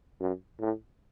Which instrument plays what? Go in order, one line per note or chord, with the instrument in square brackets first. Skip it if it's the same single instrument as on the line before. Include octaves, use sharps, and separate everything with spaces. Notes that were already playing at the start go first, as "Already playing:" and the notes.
[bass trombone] F#2
A2